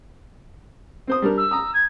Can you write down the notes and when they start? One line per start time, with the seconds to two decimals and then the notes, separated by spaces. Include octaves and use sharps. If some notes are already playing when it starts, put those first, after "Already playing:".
1.07 C4 C5 D#6
1.22 G3 D4 A#4
1.37 E6
1.51 A#5 D#6
1.74 G#6